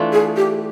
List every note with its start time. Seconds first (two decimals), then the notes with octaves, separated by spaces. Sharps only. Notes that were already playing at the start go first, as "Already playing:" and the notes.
Already playing: E3 A3 D4 F4
0.13 G#4
0.37 G4